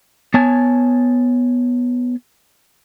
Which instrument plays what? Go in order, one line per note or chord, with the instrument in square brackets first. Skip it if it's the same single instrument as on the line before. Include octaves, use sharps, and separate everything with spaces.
[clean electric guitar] B3 C#5 G#5 A5